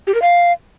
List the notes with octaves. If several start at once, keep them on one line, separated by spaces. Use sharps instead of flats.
G4
A#4
F5